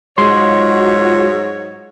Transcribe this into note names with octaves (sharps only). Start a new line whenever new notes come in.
G#2 F#3 G#3 F4 F#4 C#5 C6